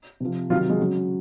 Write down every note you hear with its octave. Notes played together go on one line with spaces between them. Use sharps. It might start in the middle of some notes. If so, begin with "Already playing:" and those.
C3 F3
C3 D#3 F#3 F4
G#3
C#3 F#3